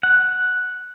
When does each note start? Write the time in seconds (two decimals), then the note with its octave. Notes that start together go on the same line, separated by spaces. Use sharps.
0.03 F#5